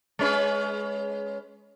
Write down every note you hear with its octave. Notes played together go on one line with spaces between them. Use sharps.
G#3 C#4 B4